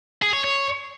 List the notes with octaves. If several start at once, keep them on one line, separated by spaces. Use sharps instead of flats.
G#4
C#5
C#5